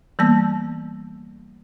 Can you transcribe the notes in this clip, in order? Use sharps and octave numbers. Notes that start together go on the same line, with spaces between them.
E3 G3 A#3 B3 A5 E6